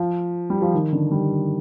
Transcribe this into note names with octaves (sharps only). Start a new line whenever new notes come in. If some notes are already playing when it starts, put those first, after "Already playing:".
Already playing: F3
G3
F3
D#3
D3
G3